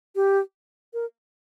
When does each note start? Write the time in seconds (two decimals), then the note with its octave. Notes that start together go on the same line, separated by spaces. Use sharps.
0.16 G4
0.94 A#4